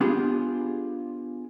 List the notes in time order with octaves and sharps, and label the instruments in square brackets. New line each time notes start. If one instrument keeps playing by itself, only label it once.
[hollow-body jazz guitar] B3 D4 F4 G4 G#4